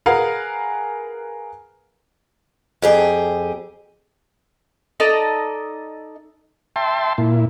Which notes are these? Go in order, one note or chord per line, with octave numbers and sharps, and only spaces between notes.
G#4 A#4 B4 F5 F#5 G#5
F2 G4 G#4
D#4 A4 D5 D#5
E5 G5 A5 C6
A#2 E4